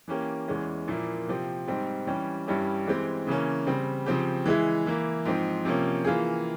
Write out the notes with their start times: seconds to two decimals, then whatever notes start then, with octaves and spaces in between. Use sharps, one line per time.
0.08 E3 A#3 C#4 G4
0.48 E2 E3 G#3 C#4
0.88 A#2 F3 A#3 E4
1.27 C3 F3 C4 G4
1.68 G#2 G3 C4
2.07 E3 G3 C#4 G4
2.48 G2 G3 C#4 E4 G4
2.87 E3 G#3 C4 G4
3.27 C#3 E3 A#3 C#4
3.66 C#3 G3 C4
4.06 C#3 F3 C4 G4
4.46 E3 G#3 E4 G#4
4.86 E3 A#3 E4
5.25 G#2 F3 C4
5.65 C3 F3 A#3 C#4
6.05 E3 A#3 F4 G#4